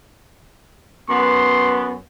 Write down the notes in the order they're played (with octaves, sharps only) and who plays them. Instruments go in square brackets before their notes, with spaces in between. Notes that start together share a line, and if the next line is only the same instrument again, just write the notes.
[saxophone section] F#2 B3 [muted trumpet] C6